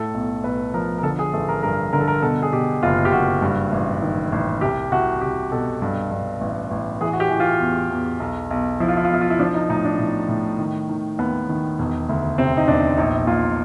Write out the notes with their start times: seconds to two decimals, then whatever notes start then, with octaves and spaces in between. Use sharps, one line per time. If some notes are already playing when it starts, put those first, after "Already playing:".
Already playing: A2 A4
0.14 B1
0.43 B1 B4
0.74 F3 A#4
0.98 A#4
1.03 D3 A4
1.19 G#4
1.33 A1 A4
1.48 A#4
1.63 G2 A#4
1.93 D3 A#4
2.00 A4
2.08 A#4
2.22 B2 A4
2.42 G#4
2.53 B2 G4
2.83 F#1 F4
3.05 G4
3.12 F#1 F#4
3.42 G2
3.72 A1
4.02 D#3
4.32 A1
4.61 C2 G4
4.92 C2 F#4
5.21 C2 G4
5.52 B2 A4
5.82 G2
6.11 G2
6.41 A1
6.71 A1
7.01 E3 G#4
7.13 F#4
7.20 G4
7.30 E3
7.40 F4
7.60 E2
7.90 E2
8.20 B1
8.51 B1
8.80 F3 E4
8.88 F4
8.97 E4
9.05 F4
9.10 B1 E4
9.21 F4
9.30 E4
9.39 F3 D4
9.55 D#4
9.69 A2 D#4
9.85 D4
9.99 A2
10.29 A2
10.59 D#3
10.89 D#3
11.19 D#2 B3
11.49 D#3
11.79 E1
12.09 D2
12.38 C3 C4
12.57 D#4
12.68 E1 D4
12.97 A#1 D#4
13.27 A#2 F4